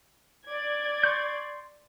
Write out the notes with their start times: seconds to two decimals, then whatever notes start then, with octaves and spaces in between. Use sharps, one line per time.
0.47 D5 G#6
1.04 C6 C#6 G6